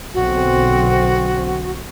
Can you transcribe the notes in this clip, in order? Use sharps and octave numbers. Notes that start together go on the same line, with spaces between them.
B1 D3 C4 F#4